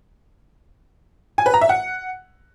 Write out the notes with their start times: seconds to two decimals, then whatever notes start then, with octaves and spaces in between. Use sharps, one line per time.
1.38 G#5
1.46 B4
1.54 A#5
1.61 E5
1.69 F#5